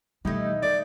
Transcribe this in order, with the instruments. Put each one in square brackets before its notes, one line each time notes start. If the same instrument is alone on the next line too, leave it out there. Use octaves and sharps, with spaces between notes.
[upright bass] B2 E3 [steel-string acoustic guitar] G3 A3 [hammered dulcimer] D#4 E4 D#5
[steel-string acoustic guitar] A3 [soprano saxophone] D5